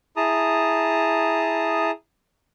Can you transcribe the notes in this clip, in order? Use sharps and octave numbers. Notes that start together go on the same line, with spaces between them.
E4 G#4 A5 A#5 D#6